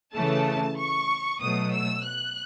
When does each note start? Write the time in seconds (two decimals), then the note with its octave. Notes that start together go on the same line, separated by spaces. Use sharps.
0.14 C#3 E3 A3 A5
0.78 C#6
1.42 B2 F#3 A3 D#6
1.74 E6
2.05 F#6